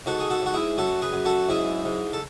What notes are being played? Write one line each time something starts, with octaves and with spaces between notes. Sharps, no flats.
G#2 F#4 A4
G#4
F#4 A4
G#2 F#4
E4 G#4
F#2 F#4 A4
G#4 B4
F#2
F#4 A4
G#2 E4 G#4
G#2
A4